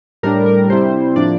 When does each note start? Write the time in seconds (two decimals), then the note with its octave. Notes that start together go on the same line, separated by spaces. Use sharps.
0.23 A2 G3 D4 A#4
0.46 A#4
0.69 C3 G3 C4 E4 C5
1.16 A2 F3 A#3 D4 D5